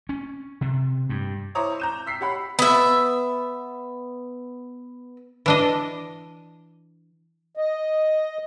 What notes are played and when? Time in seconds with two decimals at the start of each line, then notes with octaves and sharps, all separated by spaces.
0.09 C#4
0.61 C3
1.09 G2
1.55 E4 C5 C#5 A#5 D6 D#6
1.80 A#5 G6 E7
2.06 E6 B6 C7
2.21 G4 C#5 F#5 B5
2.59 B3 E5
5.46 E3 D4 D#5
7.57 D#5